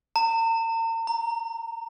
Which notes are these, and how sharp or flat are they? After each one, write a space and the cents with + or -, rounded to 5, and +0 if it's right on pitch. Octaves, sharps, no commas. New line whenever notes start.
A#5 -40
A#5 +0